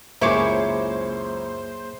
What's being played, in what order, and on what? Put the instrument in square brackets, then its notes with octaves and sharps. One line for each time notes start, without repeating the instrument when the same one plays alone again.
[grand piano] C#2 F#2 [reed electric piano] A#3 G#4 [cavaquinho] E4 C#5 D6 [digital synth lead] C5